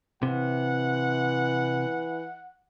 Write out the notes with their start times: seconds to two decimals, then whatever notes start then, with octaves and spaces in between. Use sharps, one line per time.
0.23 C3 E3 F#5